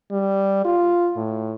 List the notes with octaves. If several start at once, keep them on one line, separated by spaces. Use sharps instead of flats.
G3
F4
A2